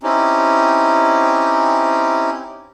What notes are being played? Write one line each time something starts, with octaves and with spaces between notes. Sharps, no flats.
C4 C#4 D#4 E4 G4